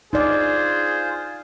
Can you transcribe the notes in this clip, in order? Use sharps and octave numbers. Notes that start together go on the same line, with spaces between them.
D#4 F4 G#4 C5 D5